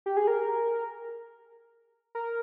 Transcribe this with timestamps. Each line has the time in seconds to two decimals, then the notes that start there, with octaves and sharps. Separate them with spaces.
0.06 G4
0.17 G#4
0.28 A#4
2.15 A#4